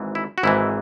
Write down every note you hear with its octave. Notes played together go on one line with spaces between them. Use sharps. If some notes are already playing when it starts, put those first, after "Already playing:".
Already playing: G#1 G#2 E3
E4
F#4
G#1 G#2 E3 E4